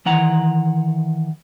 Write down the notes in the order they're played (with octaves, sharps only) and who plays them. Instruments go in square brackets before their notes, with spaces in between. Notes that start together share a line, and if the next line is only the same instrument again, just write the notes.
[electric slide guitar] D#3 E3 F#5 A#5